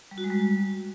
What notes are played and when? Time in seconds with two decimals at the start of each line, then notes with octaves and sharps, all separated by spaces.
0.11 G3
0.18 F#4
0.24 G#3
0.30 G3